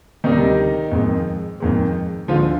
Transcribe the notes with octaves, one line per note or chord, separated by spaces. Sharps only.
D2 C3 D#3 G3 D#4
F2 D#3 G#3
F2 D#3 G#3
D2 D3 F3 G#3 F4